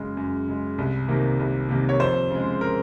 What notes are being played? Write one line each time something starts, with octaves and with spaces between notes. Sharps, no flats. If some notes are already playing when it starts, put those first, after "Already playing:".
Already playing: F#2 C#3 G#3
F#2
C#3 G#3
C2
C3 D#3 A#3
C2
C3 D#3 A#3
C#5
F2 C5
C#3 G#3
A#4